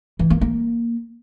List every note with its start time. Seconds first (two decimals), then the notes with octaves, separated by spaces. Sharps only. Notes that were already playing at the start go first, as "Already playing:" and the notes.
0.19 E3
0.30 A#3
0.41 A#3